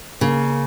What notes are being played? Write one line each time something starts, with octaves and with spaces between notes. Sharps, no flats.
C#3 A#3